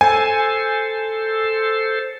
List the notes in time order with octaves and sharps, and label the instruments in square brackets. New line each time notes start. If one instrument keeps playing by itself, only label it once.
[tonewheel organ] A4 C5 [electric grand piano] G#5